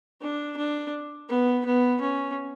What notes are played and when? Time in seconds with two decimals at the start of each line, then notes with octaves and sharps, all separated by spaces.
0.21 D4
0.57 D4
1.29 B3
1.65 B3
2.01 C#4